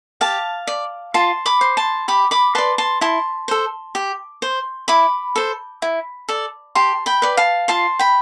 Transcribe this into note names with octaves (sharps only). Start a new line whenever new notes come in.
G4 F5 A5
D5
F4 A5 C6
B5 D6
C5
A5 C6
G4 B5 D6
B5 D6
B4 D5 A5 C6
A5 C6
E4 A5 C6
A4 C5
G4
C5
E4 B5 D6
A4 C5
E4
A4 D5
G4 A5 C6
G5 B5
B4 D5
F5 A5
F4 A5 C6
G5 B5